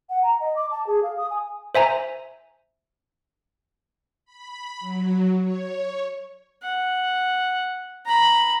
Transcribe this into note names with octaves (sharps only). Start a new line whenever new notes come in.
F#5
A#5
D#5
D6
A5
G#4
F5
D#6
G#5
C5 E5 G#5 A#5
B5
F#3
C#5
F#5
A#5 B5